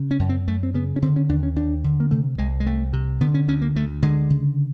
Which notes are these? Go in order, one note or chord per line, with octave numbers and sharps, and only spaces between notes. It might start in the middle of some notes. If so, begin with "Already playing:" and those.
Already playing: C#3
C#4
F#2
C4
F#2 A3
C4
C#3 B3
C#4
D3 C4
C#4
D#2 D4
C#4
D#2 D4
D3
A#3
C3 A3
C2 G#3
G#3
C2 A3
C3
D3 B3
C#4
D2 C#4
A#3
D2 A3
D3 G#3
C#3